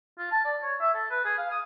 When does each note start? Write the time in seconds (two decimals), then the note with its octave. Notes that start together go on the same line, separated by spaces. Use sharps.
0.18 F4
0.31 A5
0.45 D5
0.62 C#5
0.80 E5
0.94 A4
1.10 B4
1.25 G#4
1.38 F5
1.51 D#6